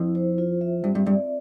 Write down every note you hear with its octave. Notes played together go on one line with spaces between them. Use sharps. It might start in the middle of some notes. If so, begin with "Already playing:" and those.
Already playing: F2 E4
C5
F4
E5
G2 C4
G2
G2 D5